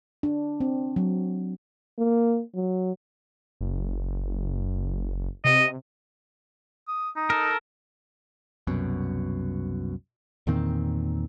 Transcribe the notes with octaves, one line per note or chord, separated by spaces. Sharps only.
D4
C4
F#3
A#3
F#3
F#1
C3 D#5
D#6
D#4
A4 A#4
C2 F#2 B2
E2 A#2 D#3 C4